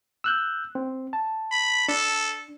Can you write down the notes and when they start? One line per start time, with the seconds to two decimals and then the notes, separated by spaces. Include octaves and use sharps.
0.24 E6 F#6 G6
0.75 C4
1.13 A5
1.51 B5
1.88 D4 A4